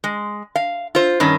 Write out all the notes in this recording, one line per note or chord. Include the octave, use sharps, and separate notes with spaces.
G#3
F5
F4 C5
G2 D#3 C#4